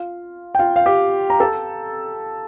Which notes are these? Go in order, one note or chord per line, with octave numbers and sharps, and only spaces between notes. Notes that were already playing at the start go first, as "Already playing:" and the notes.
Already playing: F4 F5
G5
F4 F5
F5
G4 G5
A#5
A4 A5